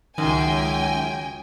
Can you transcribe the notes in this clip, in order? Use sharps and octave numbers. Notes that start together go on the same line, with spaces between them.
C#2 F#2 D#3 G5 G#5